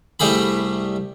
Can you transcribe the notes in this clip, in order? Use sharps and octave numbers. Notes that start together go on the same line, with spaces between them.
C2 G3 A3 G4 G#4 B5